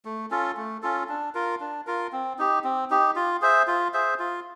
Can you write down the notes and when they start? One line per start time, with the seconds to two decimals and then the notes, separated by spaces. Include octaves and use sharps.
0.05 A3
0.31 C#4 F4 A4
0.57 A3
0.82 C#4 F4 A4
1.09 D4
1.35 F4 A#4
1.60 D4
1.87 F4 A#4
2.12 C4
2.38 D#4 G4
2.64 C4
2.90 D#4 G4
3.16 F4
3.42 G#4 C5 E5
3.67 F4
3.94 G#4 C5 E5
4.19 F4